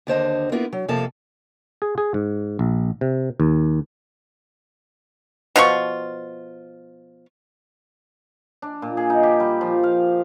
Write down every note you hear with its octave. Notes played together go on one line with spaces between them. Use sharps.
D#2 D3 C5 D#5
A#3 B3 E4 F4 A#4
F#3
F2 C3 F3 A#3 A4 A5
G#4
G#4
G#2
A#1
C3
D#2
B2 F3 F4 C#6
D4
A#2
G#4
D#4
G4
G3
F3
F5